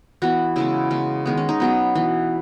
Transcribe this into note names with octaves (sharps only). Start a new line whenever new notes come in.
E3 B3 F#4
C#3 G#3 B3 E4
C#3 G#3 B3
D#3 G#3 B3
C#4
D#4
B2 F#3 B3
E3 B3